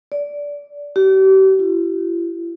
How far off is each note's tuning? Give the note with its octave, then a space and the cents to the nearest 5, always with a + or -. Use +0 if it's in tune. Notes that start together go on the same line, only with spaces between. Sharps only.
D5 -15
G4 -40
E4 +40